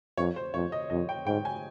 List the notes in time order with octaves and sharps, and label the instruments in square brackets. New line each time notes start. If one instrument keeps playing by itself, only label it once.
[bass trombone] F2 [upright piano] C#5
[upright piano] C5
[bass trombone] F2 [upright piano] C#5
[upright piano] D#5
[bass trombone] F2 [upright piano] D#5
[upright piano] G5
[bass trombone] G#2 [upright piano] G5
[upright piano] G#5